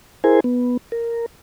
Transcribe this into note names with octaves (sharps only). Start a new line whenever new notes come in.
E4 G#4 A#4 C5 G#5
B3
A#4